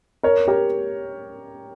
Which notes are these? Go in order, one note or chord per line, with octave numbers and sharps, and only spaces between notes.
A#4 C#5
G4 A#4